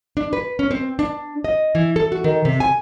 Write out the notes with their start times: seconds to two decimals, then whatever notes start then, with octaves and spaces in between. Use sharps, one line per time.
0.17 D4
0.33 B4
0.59 C#4
0.71 C4
0.99 D4
1.44 D#5
1.75 E3
1.96 A4
2.12 F#4
2.24 D#3
2.45 C3
2.60 G#5